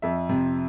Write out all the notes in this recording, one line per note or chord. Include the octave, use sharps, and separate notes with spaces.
F2 E5
C3